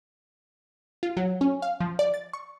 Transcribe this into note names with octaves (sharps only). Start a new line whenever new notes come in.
F4
F#3
C#4
F5
F3
D5
A6
C#6